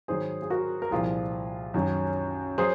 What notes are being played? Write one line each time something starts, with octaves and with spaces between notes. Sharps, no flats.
G#2 D#3 F#3 G#4 C5
G#4
F#4 A#4
A#4
C2 A#2 F3 F4 G#4
F#2 D#3 F#3
F#3 G#4 C5